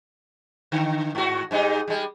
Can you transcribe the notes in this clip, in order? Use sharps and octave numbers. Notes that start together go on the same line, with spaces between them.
D3
G#2 F#4
G#2 G3 D#4
G3 G#3